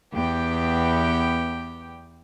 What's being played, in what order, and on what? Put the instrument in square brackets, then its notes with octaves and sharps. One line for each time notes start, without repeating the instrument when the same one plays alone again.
[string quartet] E2 B3 G4 G5